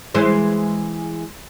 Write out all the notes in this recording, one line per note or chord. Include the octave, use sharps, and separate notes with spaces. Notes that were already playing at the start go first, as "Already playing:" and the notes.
E3 G#3 C5